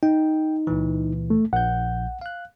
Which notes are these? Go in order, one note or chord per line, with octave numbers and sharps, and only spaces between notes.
D#4 G5
C#2 A#2 E3
A3
A#1 F#5 G6
F5 F#6